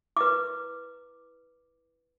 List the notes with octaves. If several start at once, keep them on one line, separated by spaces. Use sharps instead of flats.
E4 B4 D6